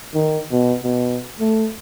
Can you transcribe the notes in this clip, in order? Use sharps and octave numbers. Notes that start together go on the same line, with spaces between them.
D#3
B2
B2
A3